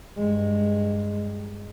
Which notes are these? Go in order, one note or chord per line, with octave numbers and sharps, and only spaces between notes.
G2 G#3